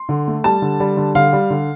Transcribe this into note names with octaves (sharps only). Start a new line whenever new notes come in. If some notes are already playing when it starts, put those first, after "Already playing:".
Already playing: C6
D3
A3
G3 A5
D3
G3
D3
D3 F5
G3
D3